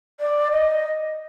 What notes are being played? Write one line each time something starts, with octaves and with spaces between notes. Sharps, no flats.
D5
D#5